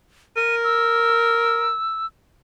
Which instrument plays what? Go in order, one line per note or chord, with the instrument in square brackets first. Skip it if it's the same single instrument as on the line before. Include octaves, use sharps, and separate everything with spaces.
[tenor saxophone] A#4 [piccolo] D#7
[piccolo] E6